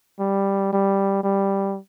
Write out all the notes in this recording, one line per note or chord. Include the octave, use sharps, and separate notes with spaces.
G3
G3
G3